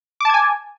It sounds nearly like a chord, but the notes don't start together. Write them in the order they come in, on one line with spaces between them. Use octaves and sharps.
D6 A5 G#6 G#5